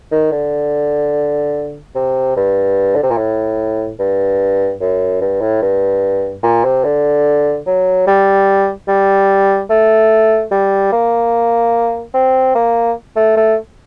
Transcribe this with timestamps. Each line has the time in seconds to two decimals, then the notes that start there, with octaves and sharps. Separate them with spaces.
0.12 D#3
0.32 D3
1.95 C3
2.36 G2
2.95 D3
3.03 C3
3.10 A#2
3.18 A2
3.99 G2
4.81 F#2
5.21 G2
5.41 A2
5.62 G2
6.43 A#2
6.64 C3
6.84 D3
7.67 F#3
8.07 G3
8.88 G3
9.70 A3
10.51 G3
10.93 A#3
12.14 C4
12.55 A#3
13.16 A3
13.37 A3